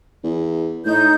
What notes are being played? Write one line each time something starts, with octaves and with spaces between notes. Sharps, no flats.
E2
A2 D#4 G6